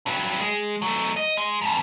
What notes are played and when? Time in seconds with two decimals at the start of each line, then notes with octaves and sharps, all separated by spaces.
0.07 G2 F#3
0.40 G#3
0.82 F#3 A3
1.17 D#5
1.37 G#3
1.61 F2 G#2